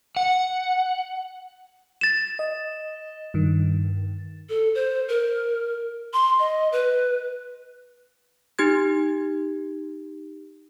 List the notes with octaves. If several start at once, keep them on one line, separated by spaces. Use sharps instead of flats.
F#5
A6 E7
D#5
G2 D#3
A4
C5
A#4
C6
D#5
B4
D#4 G4 G#6